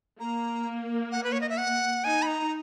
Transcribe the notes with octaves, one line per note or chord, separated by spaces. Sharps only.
A#3 A#5
F#5
B4
C#5
D#5
E5
F#5
D#4 G#5
B5
A#5